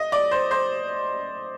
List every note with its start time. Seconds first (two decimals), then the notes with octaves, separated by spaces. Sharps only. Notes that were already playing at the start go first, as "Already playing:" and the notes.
Already playing: D#5
0.12 D5
0.31 C5
0.51 C5